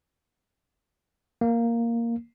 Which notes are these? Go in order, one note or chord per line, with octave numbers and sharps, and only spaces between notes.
A#3